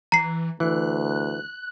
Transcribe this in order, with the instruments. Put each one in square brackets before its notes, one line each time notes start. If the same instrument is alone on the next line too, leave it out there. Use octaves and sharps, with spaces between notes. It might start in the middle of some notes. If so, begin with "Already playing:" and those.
[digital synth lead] E3 [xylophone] A#5 C7
[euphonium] D2 [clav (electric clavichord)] E3 [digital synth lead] F#6